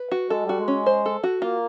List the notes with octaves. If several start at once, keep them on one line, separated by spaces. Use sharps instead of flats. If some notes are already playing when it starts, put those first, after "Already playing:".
Already playing: B4
F#4
G#3 A4
G3 F#4
G#3
C#4
C5
A4
F#4
A#3 F4